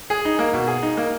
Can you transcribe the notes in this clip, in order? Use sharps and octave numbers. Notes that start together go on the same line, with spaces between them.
G#4
D#4
A#3
B2
G#4
D#4
A#3